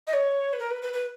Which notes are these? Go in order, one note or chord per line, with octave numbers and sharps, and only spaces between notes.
D#5
C#5
B4
A#4
B4
B4
B4